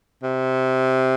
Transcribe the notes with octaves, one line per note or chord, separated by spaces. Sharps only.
C3